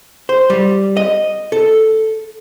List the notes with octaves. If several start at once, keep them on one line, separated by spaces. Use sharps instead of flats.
C5
G3
D#5
A4